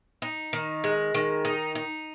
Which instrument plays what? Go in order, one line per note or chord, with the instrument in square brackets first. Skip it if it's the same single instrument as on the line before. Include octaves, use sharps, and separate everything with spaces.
[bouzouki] D#4
D#3
G#3
D#3
D#4
D#4